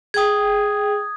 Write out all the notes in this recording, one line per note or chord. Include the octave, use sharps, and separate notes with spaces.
G#4 G5 D#6 G#6